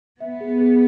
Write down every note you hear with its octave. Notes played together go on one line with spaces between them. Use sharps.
B3 E5
G#4
G#4